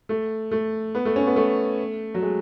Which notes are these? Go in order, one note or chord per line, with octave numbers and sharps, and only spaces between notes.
A3
A3
B3
A3
C#4
B3
A3
F#3
G#3